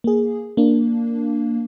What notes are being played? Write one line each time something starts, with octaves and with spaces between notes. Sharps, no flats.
A#3 G#4
A#3 D4